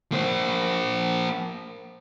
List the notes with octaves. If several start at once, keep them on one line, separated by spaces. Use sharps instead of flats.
A#3 C5